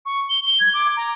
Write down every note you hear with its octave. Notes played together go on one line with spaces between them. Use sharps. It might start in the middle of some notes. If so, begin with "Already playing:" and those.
C#6
G7
G7
G#6
D6
A#5